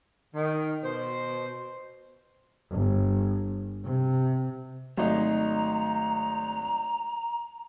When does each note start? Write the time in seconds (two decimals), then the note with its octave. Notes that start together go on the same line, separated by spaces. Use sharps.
0.35 D#3
0.84 B2 C5
2.71 G1
3.84 C3
4.97 G#1 F#3 A3 D#4 A#5